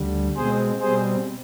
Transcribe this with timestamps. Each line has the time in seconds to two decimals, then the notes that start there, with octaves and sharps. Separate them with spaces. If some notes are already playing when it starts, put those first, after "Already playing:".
Already playing: D2 D3 G3
0.36 B2 G#3 C4 G#4 C5
0.81 B2 G3 C4 G#4 C5